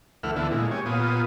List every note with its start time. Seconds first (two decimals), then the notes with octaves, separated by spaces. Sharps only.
0.23 D2 E3 A3 E5 F#5 F6
0.36 D3 E3 B3 E4
0.51 A#2 G#3
0.71 G4 C#5 G#5
0.86 A#2 B3 F4 D#6